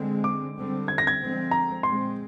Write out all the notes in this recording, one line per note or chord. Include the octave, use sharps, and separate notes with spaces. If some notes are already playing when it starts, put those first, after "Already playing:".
Already playing: D3 G#3 C4
D6
D3 G3 C4
G#6
A#6
G#6
D3 F3 G#3 C4
A#5
A#2 G#3 C4 C6